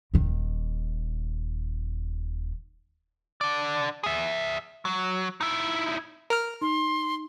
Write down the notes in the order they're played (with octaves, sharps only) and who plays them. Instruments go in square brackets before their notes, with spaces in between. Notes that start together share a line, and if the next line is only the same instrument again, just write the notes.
[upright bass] D#1 D#3
[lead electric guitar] D3 D5
G#4 E5
F#3
D#4 E4
[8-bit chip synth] A#4 F6
[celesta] D#4 [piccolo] C6